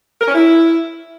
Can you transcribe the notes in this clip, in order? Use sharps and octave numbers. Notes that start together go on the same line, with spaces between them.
A#4
C#4
E4